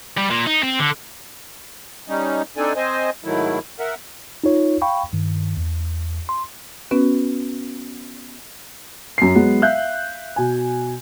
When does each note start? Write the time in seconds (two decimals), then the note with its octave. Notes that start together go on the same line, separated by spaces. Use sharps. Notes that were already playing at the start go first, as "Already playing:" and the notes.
0.17 G3
0.30 A#2
0.46 D#4
0.63 C4
0.79 D3
2.08 G3 C#4 D#4
2.57 C4 D4 D#4 A4 D5 G#5
2.76 C4 C5 D#5 G#5
3.24 G#2 D#3 F#3 A3 E4
3.79 A#4 E5 F#5
4.44 D#4 F4 C#5
4.82 F5 G5 B5 C#6
5.13 G2 D#3
5.57 E2
6.29 C6
6.91 B3 C#4 F#4 B4
9.18 F#2 C7
9.35 F#3 G#3 B3
9.62 E5 F5 F#6 G6
10.36 B2 G#5